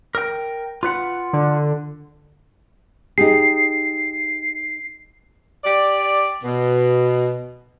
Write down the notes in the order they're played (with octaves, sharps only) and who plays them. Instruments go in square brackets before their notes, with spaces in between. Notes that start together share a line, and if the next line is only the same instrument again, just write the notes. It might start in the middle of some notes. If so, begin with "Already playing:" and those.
[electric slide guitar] A#4 G5
F4 B4 F#5
[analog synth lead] D3
[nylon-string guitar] D#4 G4 G#4 [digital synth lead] C7
[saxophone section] G4 D5
B2